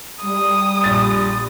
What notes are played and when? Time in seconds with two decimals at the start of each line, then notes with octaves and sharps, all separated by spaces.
0.24 G3 D#6
0.84 A#1 A6